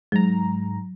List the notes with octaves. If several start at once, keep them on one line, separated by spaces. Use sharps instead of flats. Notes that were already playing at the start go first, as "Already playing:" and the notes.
G#2 F#3 A#5